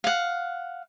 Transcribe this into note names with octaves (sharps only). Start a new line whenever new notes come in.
F5 F#5